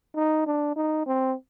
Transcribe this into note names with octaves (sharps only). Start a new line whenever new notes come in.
D#4
D4
D#4
C4